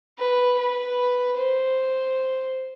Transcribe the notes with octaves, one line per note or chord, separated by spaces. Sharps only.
B4
B4
C5